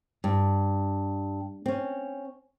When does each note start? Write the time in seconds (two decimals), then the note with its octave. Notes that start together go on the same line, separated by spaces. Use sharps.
0.24 G2
1.66 C4 C#4